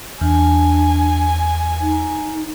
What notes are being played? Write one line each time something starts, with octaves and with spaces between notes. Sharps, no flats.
E2 D4 G#5
D#4